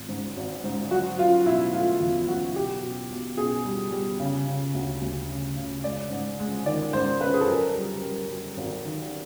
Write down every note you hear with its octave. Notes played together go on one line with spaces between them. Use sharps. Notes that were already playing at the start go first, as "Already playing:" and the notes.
Already playing: G#1 G#3
G#2
G#1
G#2
F#3 F#4
F#3 F4
B2 E4
A3 F4
E2 F4
F#3 F#4
B2 G4
B2
B1
B2 G#4
G3
G3
C#3
C#3
D2
D2
C#3
C#3
G#3 D5
G#2
G#3
D#3 D5
G#2 C5
C#4 B4
G#4
A4
F#2 A#4
G3
G3
F#2
G#1
D#3